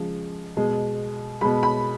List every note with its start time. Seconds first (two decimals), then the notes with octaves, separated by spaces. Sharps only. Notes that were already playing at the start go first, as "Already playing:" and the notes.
Already playing: C#3 F3 G#3
0.57 B2 G#3
1.41 B2 G#3 B5
1.63 B5